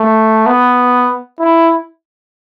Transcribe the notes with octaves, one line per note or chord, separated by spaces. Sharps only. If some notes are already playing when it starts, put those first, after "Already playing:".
Already playing: A3
B3
E4